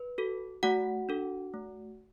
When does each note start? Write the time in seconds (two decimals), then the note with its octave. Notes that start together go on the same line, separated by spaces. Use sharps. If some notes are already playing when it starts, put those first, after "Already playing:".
Already playing: B4
0.18 F#4 A4
0.63 A3 F#4 F#5
1.09 D4 A4
1.54 A3